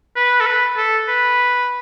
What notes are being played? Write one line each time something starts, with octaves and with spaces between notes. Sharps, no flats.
B4
A4
B4
A4
B4